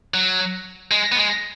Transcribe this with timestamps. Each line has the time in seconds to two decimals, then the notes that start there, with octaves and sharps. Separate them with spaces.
0.14 F#3
0.91 G#3
1.12 B3
1.17 G#3